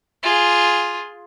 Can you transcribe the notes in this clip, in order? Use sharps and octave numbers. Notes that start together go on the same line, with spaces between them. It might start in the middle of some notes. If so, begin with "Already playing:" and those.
F4 G#4